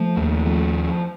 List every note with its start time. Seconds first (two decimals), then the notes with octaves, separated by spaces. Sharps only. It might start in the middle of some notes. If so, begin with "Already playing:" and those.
Already playing: F3 A3
0.17 D#2
0.46 F3